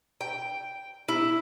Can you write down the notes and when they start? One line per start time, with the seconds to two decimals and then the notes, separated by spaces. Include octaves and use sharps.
0.21 G5
1.08 E4